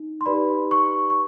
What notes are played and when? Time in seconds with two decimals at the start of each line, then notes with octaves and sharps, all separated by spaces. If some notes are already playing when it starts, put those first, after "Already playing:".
Already playing: D#4
0.21 C6
0.26 D#4 G4 B4 D5 B5
0.71 C#6
1.10 C#6